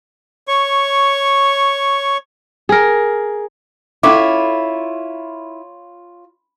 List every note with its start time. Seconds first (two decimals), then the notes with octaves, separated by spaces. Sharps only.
0.48 C#5 C#6
2.69 G#4 A#4
4.03 C#4 E4 F4 A4 C#5 D6